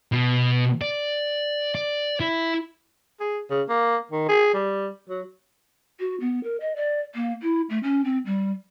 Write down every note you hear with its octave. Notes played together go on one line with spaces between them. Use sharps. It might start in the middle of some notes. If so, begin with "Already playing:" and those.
B2
D5
D5
E4
G#4
C#3
A#3
D#3
G#4
G3
F#3
F#4
B3
A#4
D#5
D5
A#3
E4
A3
C#4
C4
G3